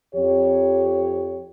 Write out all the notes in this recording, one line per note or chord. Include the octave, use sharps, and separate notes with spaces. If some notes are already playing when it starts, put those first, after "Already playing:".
F2 G4 C#5